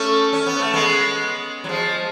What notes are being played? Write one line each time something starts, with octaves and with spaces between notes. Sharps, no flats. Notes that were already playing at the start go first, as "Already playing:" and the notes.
Already playing: A3 C#4
C#4
B3
A3
G#3 B3
F#3
F3 G#3